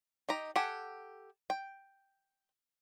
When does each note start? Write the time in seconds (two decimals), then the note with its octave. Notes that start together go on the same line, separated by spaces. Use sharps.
0.29 D#4 G4 A#5
0.56 G4 A4 F#5 G#5
1.50 G5